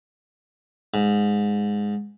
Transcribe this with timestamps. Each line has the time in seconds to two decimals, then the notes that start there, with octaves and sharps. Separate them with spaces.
0.94 G#2